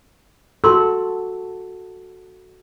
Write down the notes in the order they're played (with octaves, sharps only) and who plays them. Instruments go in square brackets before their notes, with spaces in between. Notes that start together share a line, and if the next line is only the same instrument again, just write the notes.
[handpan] F#4 A4 [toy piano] C6 E6